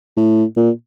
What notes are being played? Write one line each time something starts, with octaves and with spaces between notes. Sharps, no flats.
A2
A#2